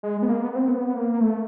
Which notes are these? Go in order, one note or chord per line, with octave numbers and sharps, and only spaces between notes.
G#3
B3
A#3
B3
C4
B3
A#3
A3